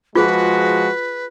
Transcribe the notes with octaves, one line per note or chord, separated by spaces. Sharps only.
F3 G#3 F4 F#4 G#4 B4